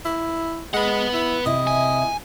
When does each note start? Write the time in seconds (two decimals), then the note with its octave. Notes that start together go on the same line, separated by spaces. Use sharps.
0.05 E4
0.74 G#3 B4 F#5
1.14 E4
1.46 C3 E4 D#5
1.67 G#5